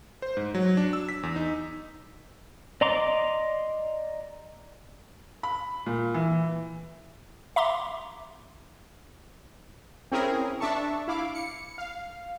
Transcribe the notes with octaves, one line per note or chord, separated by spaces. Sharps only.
C5
G#2
F#3
D4
E6
B6
E2
D#4
D5 D#5 A#5 C6 D6
B5
A#2
E3
E5 A#5 C6 D6
C4 C#4 E4 G#4 A#4
D4 E5 A5 C#6
E4 F5 D6
C#7
F5